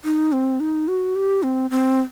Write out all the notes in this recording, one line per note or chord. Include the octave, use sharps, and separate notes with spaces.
D#4
C4
D#4
F#4
G4
C4
C4